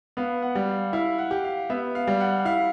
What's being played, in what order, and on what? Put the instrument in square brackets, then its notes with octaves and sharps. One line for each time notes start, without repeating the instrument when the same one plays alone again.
[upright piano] B3 [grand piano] F5
[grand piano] F#5
[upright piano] G3
[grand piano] F5
[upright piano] E4 [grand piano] F5
[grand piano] F#5
[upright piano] G4
[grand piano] F5
[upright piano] B3 [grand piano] E5
[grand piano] F5
[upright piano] G3
[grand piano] F#5
[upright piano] E4 [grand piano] F5